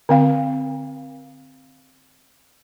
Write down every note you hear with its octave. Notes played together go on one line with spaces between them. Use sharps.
D3 C4 F5